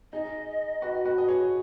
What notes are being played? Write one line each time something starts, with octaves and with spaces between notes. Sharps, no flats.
D#4 G#4 D#5
F#4 B4
F#4 B4
D#5
G#4 C#5